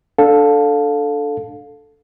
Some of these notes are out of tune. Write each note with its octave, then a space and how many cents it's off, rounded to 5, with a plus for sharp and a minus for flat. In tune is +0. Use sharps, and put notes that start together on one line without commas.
D4 +0 A4 +0 F5 +20